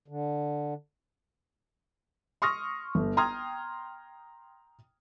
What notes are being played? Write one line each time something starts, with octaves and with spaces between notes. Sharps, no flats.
D3
C6 C#6 D#6 F6 A#6
G1
G5 A#5 C6 D#6 F6 G#6